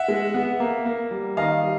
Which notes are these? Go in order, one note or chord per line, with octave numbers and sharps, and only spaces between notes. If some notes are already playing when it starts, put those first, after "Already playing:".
Already playing: E5 F#5
G#3
B3
A#3
A#3
G3
D#3 D#5 F5
G3